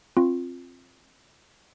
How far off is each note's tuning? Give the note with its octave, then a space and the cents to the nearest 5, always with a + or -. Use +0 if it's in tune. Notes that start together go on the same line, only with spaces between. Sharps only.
C4 +20 F4 +0 C#6 -25